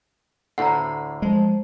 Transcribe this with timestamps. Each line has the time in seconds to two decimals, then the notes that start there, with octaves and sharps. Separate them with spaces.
0.58 D2 A2 D3 F#5 A#5
1.22 F3 G#3